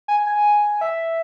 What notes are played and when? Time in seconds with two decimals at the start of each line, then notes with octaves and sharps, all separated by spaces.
0.08 G#5
0.27 G#5
0.81 E5